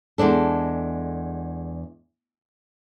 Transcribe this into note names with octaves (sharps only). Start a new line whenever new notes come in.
E2 G#3 D4 A4